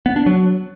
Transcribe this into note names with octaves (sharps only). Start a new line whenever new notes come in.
B3
D4
F#3